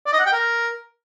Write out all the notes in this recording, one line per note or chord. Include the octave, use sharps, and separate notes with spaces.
D5
D#5
F#5
G5
A#4